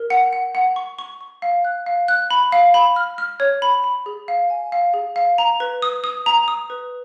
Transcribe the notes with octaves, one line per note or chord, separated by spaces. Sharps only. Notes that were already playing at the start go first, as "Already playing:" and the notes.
Already playing: A#4
F#5
F#5
F#5
C#6
C#6
C#6
F5
F#6
F5
F#6
B5
F5
B5
F6
F6
C#5
B5
B5
G#4
F5
G#5
F5
G#4
F5
A#5
B4
D#6
D#6
A#5
D#6
B4